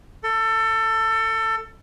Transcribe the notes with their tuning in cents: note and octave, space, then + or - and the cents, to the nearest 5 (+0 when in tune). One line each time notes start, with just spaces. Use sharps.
A4 +25